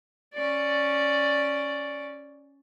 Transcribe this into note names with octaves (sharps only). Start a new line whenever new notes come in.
C#4 D5